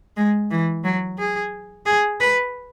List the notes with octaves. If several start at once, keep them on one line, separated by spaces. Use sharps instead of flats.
G#3
E3
F#3
G#4
G#4
B4